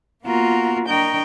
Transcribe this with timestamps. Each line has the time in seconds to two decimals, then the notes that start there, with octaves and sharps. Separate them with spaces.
0.24 A#3 B3 F4 F#4 A#4
0.86 D4 A#4 D#5 G5 C#6